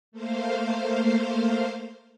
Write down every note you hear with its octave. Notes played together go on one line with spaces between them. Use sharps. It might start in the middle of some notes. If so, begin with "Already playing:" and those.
A3 A#3 C5 F5